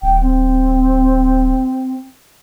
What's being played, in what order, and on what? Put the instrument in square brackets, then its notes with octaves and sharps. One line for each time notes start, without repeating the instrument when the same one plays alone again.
[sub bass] D1 [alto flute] G5
[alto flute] C4